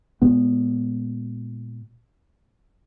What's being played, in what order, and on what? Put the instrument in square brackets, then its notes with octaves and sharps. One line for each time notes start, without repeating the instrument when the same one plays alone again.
[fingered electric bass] A#2 G#3 B3